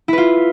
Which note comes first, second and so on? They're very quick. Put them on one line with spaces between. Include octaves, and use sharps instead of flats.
E4 B4 F4